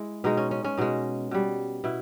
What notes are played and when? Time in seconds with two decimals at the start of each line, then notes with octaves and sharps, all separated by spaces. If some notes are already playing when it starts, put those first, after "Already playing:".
Already playing: G#3 E4
0.24 B2 G#3 D#4
0.37 C#4
0.51 C#4
0.65 C#4
0.77 B2 G#3 D#4
1.31 B2 G3
1.84 B2 E4